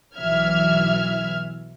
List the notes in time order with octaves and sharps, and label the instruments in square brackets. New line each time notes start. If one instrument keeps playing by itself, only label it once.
[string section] B1 E3 F#3 E5 F6 G#6